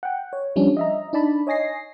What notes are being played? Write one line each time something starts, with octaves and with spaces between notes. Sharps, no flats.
F#5 G5
C#5
F3 G3 C#4 D4
D#5 E5 A#5
D4 D#4 D5 A5 B5
C#5 D#5 G#5 A#6 C7